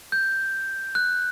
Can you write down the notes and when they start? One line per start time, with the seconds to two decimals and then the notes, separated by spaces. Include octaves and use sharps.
0.12 G6
0.95 F#6